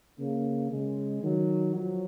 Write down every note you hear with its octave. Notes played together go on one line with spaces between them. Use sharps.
C#3 A#3
C#3 G#3
D#3 F#3
F3 F#3